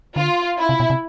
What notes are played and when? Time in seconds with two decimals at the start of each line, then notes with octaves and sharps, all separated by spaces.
0.16 D3 F4
0.58 E4
0.69 C3
0.80 B2
0.90 C3